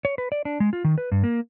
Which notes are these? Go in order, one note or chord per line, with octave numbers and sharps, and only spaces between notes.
C#5
B4
D5
D4
G#3
F4
D#3
B4
G2
A#3